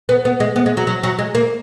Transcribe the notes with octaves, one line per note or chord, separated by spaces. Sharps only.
B3
B3
G#3
B3
G#3
F#3
F#3
F#3
G#3
A#3